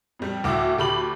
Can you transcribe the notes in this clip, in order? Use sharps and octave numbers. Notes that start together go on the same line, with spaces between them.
F2 G3
D2 A2 F#4 E5 D6
D2 G4 B5 D6 F#7